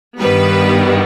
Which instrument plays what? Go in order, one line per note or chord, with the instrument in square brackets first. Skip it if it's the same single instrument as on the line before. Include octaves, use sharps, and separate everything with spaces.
[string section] G2 D#3 G3 B3 B4